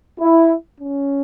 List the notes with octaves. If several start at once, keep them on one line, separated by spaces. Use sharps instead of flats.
E4
C#4